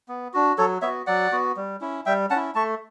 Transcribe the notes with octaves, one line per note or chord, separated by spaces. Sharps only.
B3
D4 F#4
F#3 A4 C#5
B3 F#4 C#5 E5
F#3 D5 F#5
B3 F#4
G3
C#4 E4
G3 E5 G5
C#4 F#5 A5
E4
A3 A5 C#6